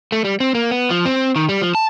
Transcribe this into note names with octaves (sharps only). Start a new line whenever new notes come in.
A3
G3
C4
A#3
B3
F3
C4
D#3
G3
F3
A5